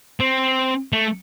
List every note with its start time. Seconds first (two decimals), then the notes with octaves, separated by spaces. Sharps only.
0.20 C4
0.93 A3